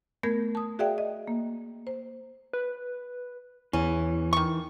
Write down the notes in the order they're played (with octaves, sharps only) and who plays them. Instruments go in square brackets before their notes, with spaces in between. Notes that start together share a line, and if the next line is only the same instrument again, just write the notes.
[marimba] A3 B3 A#4 G6 G#6 A#6
A5 D#6
F#4 G#4 D5 E5 F5 G5
D#5
A#3
C5
[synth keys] B4
[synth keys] E2 [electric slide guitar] E3 [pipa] C#4
[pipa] D#3 C#6